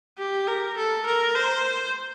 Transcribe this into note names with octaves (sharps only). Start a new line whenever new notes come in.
G4
A#4
A4
A#4
C5